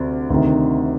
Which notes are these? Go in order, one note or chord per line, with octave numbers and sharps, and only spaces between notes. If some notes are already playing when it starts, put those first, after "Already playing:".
Already playing: D2 C3
D2 C3 D#3